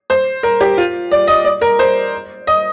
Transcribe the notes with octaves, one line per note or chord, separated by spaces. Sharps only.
C5
A#4
G4
F4
D5
D#5
D5
A#4
C5
D#5